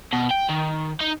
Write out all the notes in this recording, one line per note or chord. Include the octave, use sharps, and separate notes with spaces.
B2
G5
D#3
D#4